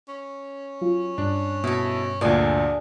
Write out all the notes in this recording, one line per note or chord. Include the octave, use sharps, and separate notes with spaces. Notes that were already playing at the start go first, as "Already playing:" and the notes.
C#4
F#3 F4
G2 D4
B2 E4 A4
D2 A#2 D4 G#4 G#5